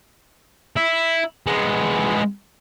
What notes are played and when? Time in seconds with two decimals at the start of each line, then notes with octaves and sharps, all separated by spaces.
0.76 E4
1.47 G#3 B3